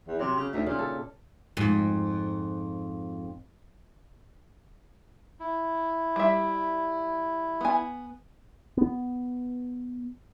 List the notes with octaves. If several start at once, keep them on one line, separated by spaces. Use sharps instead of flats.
E2
C3 F#3
C#3
D2 D4 D#4 E5
A#2 C#3
A4
F2 G#2
E4
G3 E5
B3 G#5
B3